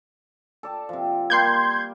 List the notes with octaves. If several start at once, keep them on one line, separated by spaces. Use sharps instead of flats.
A4 D5 A5
C3 F3
G3 A#3 A#4 C6 G6 G#6